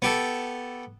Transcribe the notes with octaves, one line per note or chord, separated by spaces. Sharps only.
B3 G4 A4